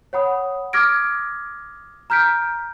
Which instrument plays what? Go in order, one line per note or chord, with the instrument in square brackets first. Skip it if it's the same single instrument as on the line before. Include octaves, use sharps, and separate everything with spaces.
[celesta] C#5 F#5 B5 D#6
D6 D#6 F6 G#6 A#6 D7
A#5 F6 G6 B6 D7